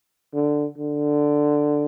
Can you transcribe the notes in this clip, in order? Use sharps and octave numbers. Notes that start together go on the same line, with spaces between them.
D3
D3